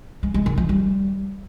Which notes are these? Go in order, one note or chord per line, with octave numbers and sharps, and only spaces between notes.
G#3
G#3
D#3
F3
G3